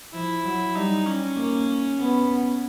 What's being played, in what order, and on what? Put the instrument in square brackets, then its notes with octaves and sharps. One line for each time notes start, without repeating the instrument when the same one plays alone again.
[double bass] F3 [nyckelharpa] E4
[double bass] F#3
[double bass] G3 [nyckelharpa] D#4
[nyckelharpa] C#4
[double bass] A#3
B3